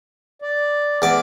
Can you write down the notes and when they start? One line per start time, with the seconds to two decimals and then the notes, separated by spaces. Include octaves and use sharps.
0.42 D5
1.02 E2 D5